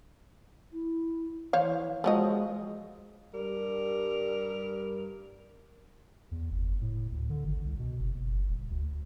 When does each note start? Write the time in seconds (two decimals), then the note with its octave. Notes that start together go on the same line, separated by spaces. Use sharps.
0.73 E4
1.53 E3 C5 C#5 F5
2.04 F3 F#3 G#3 D#5
3.34 G2 G3 A#4
6.31 E2
6.50 F#1
6.81 A2
7.12 D2
7.30 D3
7.44 G#1
7.64 C2
7.79 B2
7.99 F#1
8.14 F#1
8.48 D#1
8.70 D2